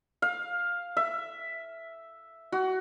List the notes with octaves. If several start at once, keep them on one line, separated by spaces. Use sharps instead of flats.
F5
E5
F#4